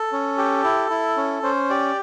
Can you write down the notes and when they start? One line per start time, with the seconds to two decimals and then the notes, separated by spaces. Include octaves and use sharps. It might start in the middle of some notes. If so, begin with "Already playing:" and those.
Already playing: A4
0.12 C#4
0.38 G4
0.64 E4
0.90 E4
1.17 C#4
1.43 C#4 C5
1.70 G4 D5